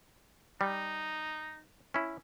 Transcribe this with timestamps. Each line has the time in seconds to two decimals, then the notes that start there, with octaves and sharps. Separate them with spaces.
0.61 G3 D#4
1.94 C#4 E4